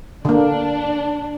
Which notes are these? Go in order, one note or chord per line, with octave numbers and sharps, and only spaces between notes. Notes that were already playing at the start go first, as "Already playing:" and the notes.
D3 A#3 D4